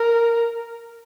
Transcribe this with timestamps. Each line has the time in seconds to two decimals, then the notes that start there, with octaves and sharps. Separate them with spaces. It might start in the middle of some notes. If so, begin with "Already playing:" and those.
Already playing: A#4